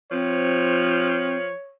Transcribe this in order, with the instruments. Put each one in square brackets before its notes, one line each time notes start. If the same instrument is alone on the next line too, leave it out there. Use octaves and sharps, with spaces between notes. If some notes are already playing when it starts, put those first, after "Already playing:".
[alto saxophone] F3 [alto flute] C4 [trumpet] C#5